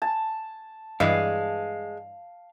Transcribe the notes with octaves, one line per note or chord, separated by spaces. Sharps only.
A5
G2 E3 G#3 F5